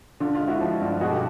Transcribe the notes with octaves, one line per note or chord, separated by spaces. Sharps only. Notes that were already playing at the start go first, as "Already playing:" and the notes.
D3 F4
F4
G#3
E4 F#4
F3
G2
B2 F#4 G#4
G4 A4